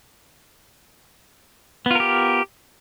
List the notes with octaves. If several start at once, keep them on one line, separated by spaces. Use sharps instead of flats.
B3 F4 G4 A#4